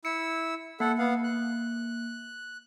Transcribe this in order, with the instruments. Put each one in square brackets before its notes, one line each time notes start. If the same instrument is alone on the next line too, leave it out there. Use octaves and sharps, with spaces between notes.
[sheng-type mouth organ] E4 E6 [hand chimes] C#7
[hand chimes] A#3 [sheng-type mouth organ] A4 F#5
[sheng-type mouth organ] B3 F5 F#5
F#6